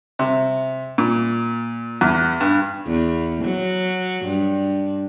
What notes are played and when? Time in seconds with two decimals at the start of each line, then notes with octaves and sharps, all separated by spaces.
0.19 C3
0.98 A#2
2.01 E2
2.40 G2
2.86 E2
3.44 F#3
4.25 G2